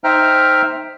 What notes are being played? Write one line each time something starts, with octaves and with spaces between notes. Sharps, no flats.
D#4 C5 E5 G5 A#5 F6